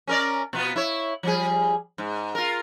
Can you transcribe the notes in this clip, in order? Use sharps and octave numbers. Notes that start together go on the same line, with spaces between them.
C#4 A#4 D5
B2 B3 F4
E4 C#5
F3 G3 G#4
G#2
F4 A#4